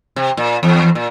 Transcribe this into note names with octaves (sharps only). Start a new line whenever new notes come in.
C3
A#2
E2
A#2